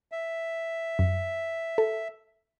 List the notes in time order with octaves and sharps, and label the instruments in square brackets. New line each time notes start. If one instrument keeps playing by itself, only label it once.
[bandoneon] E5
[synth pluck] F#2
A4